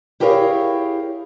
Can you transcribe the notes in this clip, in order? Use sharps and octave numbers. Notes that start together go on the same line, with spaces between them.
E4 G4 G#4 A#4 C#5 F5